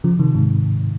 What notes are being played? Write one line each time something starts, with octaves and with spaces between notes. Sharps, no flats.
C#3 F3
C3 D#3
G#2 C3